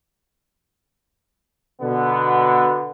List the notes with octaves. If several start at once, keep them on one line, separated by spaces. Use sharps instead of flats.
B2 D3 B3